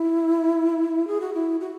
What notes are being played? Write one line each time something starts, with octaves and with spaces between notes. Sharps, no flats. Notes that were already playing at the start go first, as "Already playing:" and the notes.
Already playing: E4
G#4
F#4
E4
F#4